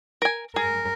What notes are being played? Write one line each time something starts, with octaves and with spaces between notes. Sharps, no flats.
A#4 G#5
G#4 A#4